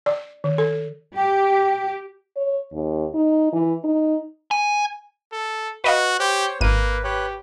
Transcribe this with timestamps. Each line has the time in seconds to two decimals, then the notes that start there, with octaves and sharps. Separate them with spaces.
0.06 D5
0.44 D#3
0.58 A4
1.16 G4 G5
2.36 C#5
2.73 D#2
3.14 D#4
3.52 E3
3.84 D#4
4.51 G#5
5.32 A4
5.84 F#4 B4 D#5 F5
6.20 G4 C5 C#5
6.61 G#1 A#3 B4 D#7
7.04 G4 B4 C#5 F#6